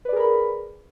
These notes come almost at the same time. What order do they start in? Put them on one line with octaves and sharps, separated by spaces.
B4 D5 G#4 A#4 B5